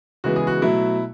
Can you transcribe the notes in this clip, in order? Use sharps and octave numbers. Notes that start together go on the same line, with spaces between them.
C#3 E3 G#3 B3 F#4
G#4
F#4
B2 F#3 A3 E4